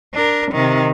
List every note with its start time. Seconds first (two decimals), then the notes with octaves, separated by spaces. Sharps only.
0.14 D4 A#4
0.51 C3 D#3